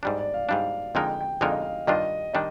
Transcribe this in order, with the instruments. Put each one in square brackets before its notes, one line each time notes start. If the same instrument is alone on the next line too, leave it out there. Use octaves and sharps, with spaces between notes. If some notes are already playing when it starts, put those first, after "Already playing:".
[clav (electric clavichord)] G#2 G3 D4 [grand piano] D5
[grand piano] D5
F5
[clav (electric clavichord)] G#2 G3 D4 [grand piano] F5
[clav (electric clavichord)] F2 D3 G#3 D#4 A#4 [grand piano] G5
[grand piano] G5
[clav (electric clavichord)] F2 D3 G#3 D#4 A#4 [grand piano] F5
[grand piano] D#5
F5
[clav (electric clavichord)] G2 D#3 G3 D4 F4 [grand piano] D#5
[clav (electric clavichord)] D#3 G3 D4 [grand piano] D#5